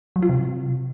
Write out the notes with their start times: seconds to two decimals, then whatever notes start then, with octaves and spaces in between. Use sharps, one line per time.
0.16 F#3
0.23 F4
0.29 C3